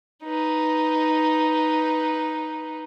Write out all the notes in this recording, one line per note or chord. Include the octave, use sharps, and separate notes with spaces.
D#4 B4